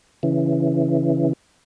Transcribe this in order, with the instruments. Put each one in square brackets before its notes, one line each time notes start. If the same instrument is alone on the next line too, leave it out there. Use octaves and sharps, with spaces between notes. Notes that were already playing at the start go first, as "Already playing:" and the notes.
[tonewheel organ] C#3 E3